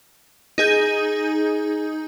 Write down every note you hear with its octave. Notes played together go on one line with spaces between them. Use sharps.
D#4 G#4 G6